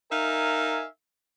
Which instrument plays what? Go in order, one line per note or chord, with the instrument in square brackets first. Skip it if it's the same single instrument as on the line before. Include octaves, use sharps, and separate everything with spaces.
[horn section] D#4 A#4 E5 F5 G#5